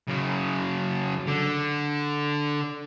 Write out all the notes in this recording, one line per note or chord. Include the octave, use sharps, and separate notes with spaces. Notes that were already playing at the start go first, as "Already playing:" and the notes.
F#2 C#3
D3